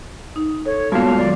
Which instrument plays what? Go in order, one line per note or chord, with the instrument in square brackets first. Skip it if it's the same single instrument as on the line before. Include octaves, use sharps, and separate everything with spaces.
[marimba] D#4
[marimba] A4 [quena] C#5
[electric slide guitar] G2 A#2 F4 [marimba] G#3 B3 F#4 [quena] A5
[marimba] D#3 F#3 A#3 [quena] D5